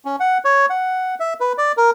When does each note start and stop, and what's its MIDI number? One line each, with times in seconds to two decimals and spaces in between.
0.05 0.16 61
0.20 0.38 78
0.45 0.66 73
0.70 1.15 78
1.20 1.34 76
1.40 1.53 71
1.58 1.72 74
1.77 1.91 70